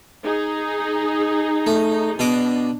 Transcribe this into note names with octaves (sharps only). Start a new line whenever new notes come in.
D#4 G#4
A3
B2 D4 D#5 D6